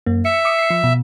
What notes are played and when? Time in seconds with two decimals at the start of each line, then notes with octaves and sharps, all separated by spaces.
0.06 F#2 A#3
0.25 E5 C#7
0.45 D6 D#6 C#7
0.58 C7 C#7
0.70 F3
0.84 B2